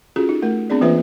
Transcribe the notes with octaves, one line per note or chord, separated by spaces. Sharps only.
C#4 F4 F#4 G#4 A4
D#4
A3 A#4
B3 C4 D4 G#4 D5
E3 A#3 F4 B4 C5 E5